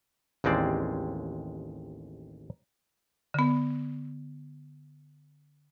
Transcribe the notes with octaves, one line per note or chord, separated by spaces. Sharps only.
A1 D#2 G#3 C4 D5
D3 B3